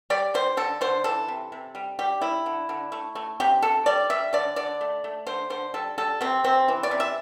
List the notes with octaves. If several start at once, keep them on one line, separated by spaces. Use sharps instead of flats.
G3 D5
G3 C5
D3 A4
D3 C5
E3 A4
C3
C3
G3
G3 G4
G3 E4
D3
D3
A3
A3
C3 G4
C3 A4
G3 D5
G3 E5
D3 D5
D3 D5
A3
A3
D3 C5
D3 C5
G3 A4
G3 A4
C3 C4
C3 C4
E3
D5
C3
E5